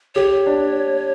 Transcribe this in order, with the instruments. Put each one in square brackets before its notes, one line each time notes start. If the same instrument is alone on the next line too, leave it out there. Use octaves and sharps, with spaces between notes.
[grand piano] G4 [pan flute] C#5
[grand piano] D4